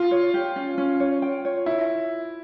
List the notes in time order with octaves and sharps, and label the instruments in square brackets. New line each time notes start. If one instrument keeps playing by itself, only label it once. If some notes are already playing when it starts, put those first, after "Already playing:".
Already playing: [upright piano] F4
[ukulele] C#5
G4
C#4
C#4
C#5
G5
C#5
[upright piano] E4